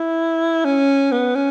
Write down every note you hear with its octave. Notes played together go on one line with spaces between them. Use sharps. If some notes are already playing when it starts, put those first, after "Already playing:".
Already playing: E4
C#4
B3
C#4